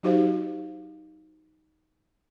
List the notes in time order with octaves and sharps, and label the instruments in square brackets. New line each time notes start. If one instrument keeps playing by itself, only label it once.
[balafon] F#3 D#4 F#4 G4 C5 F5